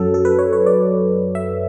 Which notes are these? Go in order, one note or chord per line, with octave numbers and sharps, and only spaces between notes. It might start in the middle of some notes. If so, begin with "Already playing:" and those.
Already playing: F#2 F#3 A4
A4
B4
C#5
C#5
D5
E5